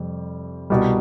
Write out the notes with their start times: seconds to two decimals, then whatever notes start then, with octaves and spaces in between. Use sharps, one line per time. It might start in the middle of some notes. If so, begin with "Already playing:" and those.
Already playing: F2 C3 G3
0.70 C2 B2 G3